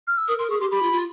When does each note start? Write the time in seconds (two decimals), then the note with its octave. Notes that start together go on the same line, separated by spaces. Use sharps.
0.08 F6
0.18 E6
0.28 A#4 D#6
0.39 A#4 C6
0.50 G#4 C#6
0.60 G4 C6
0.71 G4 B5
0.82 F4
0.93 F4